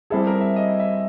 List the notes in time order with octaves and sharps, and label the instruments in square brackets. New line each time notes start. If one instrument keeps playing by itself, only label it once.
[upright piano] G3 C4 E4 G#4 [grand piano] A4
[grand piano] A#4
E5
D#5
E5